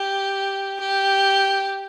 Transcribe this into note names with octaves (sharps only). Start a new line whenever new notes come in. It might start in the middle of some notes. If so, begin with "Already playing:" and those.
Already playing: G4
G4